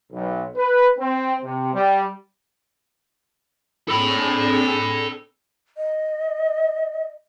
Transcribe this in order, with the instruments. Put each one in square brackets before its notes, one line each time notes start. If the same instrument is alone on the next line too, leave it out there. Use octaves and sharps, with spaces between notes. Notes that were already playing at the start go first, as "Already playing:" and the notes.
[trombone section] B1
B4
C4
C3
G3
[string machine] C4 D4 G#4 [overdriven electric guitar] A4 B5
[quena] D#5